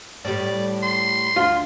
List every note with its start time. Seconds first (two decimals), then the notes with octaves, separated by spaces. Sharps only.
0.25 A2 G3 D5
0.83 C6
1.36 D2 F4